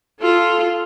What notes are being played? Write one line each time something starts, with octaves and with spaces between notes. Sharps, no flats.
F4 A4